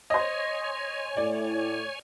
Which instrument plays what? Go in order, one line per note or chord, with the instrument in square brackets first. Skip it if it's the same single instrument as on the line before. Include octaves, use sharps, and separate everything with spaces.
[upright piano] C5 D#5 [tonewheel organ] C#5 G#5
[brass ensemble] A2 [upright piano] D5